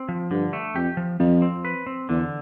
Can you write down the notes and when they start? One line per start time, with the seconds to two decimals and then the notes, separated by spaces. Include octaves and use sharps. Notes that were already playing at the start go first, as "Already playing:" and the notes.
Already playing: C4
0.09 F3
0.31 G2 D3
0.53 A3
0.75 F2 G4
0.97 F3
1.19 F2 F3
1.42 C4
1.65 B4
1.87 C4
2.09 E2 D3